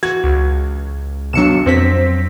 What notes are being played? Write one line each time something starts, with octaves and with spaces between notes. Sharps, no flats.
E3 F#4 G#6
C#2
B1 F#3 D4 C#7 E7
F2 F#3 C4 B6